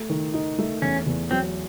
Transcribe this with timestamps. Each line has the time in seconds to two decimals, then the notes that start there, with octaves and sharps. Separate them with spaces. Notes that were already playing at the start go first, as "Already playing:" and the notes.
Already playing: A3
0.10 D#3
0.34 D#4
0.58 A3
0.82 E2 C#4
1.07 E2
1.31 F#3 C4